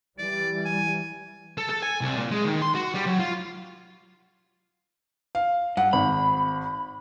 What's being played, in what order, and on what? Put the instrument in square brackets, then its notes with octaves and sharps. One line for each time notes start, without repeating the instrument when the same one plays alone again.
[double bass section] E3 G3 [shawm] D5
[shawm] G#5
[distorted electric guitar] A4
A4
G#5
C2
A#2
G#3
D#3
C6
F#4
G3
F#3
F4
[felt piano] F5
[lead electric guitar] G2 [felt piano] F#5
[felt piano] G#1 [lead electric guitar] B5